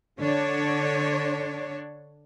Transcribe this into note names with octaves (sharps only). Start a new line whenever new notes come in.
D3 D4 C#5